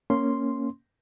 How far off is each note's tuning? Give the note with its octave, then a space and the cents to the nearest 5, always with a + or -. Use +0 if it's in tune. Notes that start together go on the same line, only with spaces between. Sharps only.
A#3 +0 C#4 +0 C6 +0